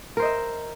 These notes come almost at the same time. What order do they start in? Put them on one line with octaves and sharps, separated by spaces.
A#4 C5 D#5 E5